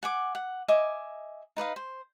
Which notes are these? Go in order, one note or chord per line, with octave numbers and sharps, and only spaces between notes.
F#5 G#5 D6
F#5
D#5 E5 G#5 D6
D#4 B4 D#5 F5
C5